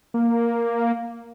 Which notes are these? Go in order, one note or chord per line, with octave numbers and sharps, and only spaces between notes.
A#3